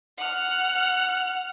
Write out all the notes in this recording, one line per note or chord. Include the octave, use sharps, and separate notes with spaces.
F#5 F6